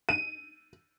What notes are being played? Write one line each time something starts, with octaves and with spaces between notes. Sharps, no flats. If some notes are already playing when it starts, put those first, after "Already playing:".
D#7